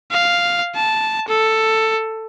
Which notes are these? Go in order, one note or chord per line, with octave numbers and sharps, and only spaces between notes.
F5
A5
A4